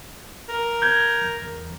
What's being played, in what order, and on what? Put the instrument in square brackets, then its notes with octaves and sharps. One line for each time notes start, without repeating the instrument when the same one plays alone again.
[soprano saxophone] A#4
[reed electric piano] G6 G#6
E2